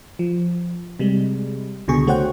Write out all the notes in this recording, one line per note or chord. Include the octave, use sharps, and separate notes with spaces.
F3
C3 G3 G#3
C#2 B2 D3 G#4 C#6
A3 F#4 C5 C#5 F#5 G5